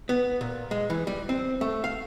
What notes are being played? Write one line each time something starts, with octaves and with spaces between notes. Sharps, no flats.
B3
A#2
G#3
E3
G3
C4
A3
F5